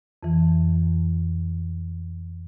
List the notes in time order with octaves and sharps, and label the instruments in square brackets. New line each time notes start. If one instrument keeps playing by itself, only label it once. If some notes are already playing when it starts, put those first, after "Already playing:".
[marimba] F2 E3